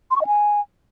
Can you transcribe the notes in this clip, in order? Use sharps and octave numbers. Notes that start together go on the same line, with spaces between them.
C6
C#6
D#5
G#5